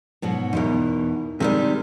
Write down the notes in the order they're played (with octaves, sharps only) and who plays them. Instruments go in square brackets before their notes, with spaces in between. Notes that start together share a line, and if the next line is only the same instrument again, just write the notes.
[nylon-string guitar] G#2 B2 F#3
[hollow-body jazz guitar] E2 B2 [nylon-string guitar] D#4 E4 A#4
[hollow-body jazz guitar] C3 D#3 G3 [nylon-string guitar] G#3